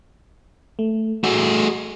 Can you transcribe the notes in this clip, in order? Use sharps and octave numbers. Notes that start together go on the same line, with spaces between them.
A3
A3 F#4 G#4